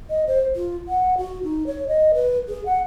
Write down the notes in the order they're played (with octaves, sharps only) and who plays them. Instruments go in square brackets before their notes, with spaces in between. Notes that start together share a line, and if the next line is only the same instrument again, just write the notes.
[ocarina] D#5
C5
F4
F#5
F#4
D#4
C#5
D#5
B4
G#4
F#5